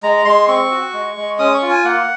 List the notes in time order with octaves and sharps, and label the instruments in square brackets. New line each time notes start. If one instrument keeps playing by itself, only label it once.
[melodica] G#3 A#5
G#3 C6
C4 C#6
F#4
G#3
G#3
C#4 D#6
C#6
F4
G#5
A#3 F#5